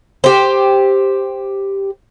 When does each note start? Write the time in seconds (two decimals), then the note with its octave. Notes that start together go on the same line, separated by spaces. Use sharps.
0.24 G4 C5